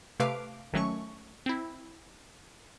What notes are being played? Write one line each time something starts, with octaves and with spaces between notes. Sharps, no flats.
C3 A3 B4 F5 D6 D7
G#1 D#3 F#3 A3 C#4 C#6
C4 E4